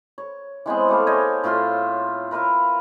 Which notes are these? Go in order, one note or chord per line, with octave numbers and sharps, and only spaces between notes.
C#5
E3 G#3 B3 C4
G3 A3 F5
C5 C#5 D#5 G#5
A2 F4 E5 C6
A#4 B4 E5 F5